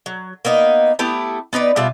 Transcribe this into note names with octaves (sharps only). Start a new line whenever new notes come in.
F#3
A#3 B3 D#4 D#5
A3 B3 E4 G4
B3 D#4 B4 D5
B2 G3 F4 E5